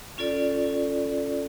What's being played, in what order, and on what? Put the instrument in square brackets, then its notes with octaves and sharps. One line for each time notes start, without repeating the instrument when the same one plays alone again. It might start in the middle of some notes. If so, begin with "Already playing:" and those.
[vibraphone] C#4 F4 A4 D5